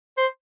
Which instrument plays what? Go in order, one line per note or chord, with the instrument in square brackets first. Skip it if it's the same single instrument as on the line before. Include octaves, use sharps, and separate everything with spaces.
[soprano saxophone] C5